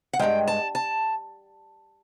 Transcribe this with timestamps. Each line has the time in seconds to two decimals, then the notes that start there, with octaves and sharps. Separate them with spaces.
0.13 F#5
0.19 G2 D#3 G#3 G5
0.48 A5
0.75 A5